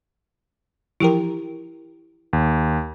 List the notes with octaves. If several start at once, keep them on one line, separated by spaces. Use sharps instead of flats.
E3 F3 E4 G4 A#4 G5
D#2